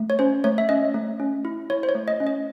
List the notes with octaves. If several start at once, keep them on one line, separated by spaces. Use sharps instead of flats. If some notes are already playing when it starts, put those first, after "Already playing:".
Already playing: A3
C#5
C#4 C5
A3 C#5
E5
C#4 D#5
A3
C#4
E4
E4 C#5
C5
C#5
A3
D#5
C#4
D#5